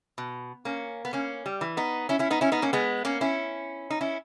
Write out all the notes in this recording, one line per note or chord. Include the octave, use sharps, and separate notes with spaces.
B2
A#3 C#4
B3
A#3 C#4
G3
E3
B3 D#4
C#4 E4
C#4 E4
B3 D#4
C#4 E4
B3 D#4
A#3 C#4
G#3 B3
A#3 C#4
C#4 E4
D#4
C#4 E4